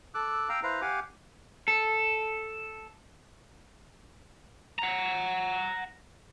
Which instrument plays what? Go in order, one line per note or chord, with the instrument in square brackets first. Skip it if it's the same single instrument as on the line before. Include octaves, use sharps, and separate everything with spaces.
[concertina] A4 D6 E6 F#6
F5 G5 A#5 E6
E4 B4 C5 F5 A#5
G4 F5 F#5 G#5 D6
[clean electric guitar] A4
[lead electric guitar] F#5 A#5